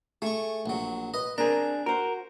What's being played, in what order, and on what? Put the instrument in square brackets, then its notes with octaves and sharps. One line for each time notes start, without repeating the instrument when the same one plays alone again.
[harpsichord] A3 C#6 [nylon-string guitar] G#4
[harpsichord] A#1 F#3
[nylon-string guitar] B4 [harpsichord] D#5
[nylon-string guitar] C4 A#4 [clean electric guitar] D4 G#4 [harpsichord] A#5
[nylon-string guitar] F#4 C5 [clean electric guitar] A#4